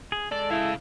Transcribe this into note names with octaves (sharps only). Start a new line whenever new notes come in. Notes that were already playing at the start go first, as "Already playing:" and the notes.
G#4
G#3 A4 D5
C#3 E4 F5